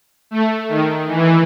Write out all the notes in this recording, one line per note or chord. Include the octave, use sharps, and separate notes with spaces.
A3
D#3
E3